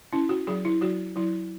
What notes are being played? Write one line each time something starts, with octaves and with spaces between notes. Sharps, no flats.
C#4 E4
F#4
F#3 G#4
E4
F#3 F#4
F#3 E4